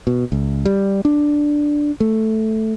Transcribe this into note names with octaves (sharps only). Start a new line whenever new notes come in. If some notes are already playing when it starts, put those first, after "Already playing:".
B2
C#2
G3
D4
A3